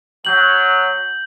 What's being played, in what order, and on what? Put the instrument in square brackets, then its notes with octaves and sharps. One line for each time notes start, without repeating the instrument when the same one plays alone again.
[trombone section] F#3 [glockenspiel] G6 F#7